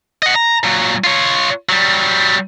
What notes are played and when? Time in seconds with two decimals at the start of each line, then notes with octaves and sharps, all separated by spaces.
0.23 D#5 F#5
0.35 A#5
0.63 A#2 F#3
1.04 F4 C#5
1.69 F#3 G3